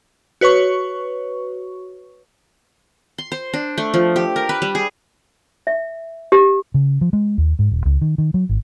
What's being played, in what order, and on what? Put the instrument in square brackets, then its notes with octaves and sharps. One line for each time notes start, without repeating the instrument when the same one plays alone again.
[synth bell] F#4 B4 C#5 C#6
[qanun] C6
C5
D4
A3
F3
G4
A#4
B4
G3
G#4
[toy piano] E5
G4
[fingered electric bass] C#3
F3
G#3
D#2
G#2
D#1
C#2
D#3
D#3
F#3
G#1